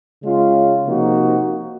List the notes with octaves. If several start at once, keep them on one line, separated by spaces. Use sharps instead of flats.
C#3 G#3 C#4 F4
C3 F3 A#3 D#4 F#4